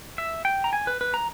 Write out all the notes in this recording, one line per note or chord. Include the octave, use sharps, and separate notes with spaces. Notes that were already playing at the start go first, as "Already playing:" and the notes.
E5
G5
A#5
G#5
B4
B4
A#5